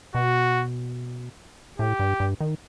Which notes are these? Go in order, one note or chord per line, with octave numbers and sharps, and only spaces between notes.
B2 F#4
A2 G4
G2
G2
D#3